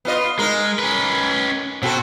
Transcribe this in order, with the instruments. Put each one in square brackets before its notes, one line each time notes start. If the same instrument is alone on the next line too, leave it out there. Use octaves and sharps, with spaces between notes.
[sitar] B3 F4 D#5
[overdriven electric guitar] G#3 [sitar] D#4 A#4
[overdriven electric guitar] C#4 B4
[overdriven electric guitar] B2 [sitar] C4 F#4 A4